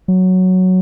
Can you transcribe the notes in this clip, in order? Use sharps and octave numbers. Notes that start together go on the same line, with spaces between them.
F#3